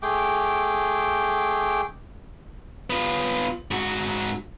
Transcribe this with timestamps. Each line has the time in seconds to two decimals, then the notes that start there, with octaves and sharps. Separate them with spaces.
0.03 A3 G#4 G5 D6
2.90 B3 F4
3.71 G#2 F#4